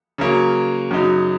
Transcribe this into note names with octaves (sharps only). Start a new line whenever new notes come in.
C#3 F#3 A#3 C#4
F#2 C#3 F#3 D#4